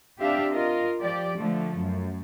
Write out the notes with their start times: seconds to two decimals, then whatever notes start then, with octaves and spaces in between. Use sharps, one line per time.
0.20 C4 D4 G4 E5 F5
0.52 F4 A#4 D#5
1.01 F3 G4 D5
1.38 D3 F3 A3
1.77 F#2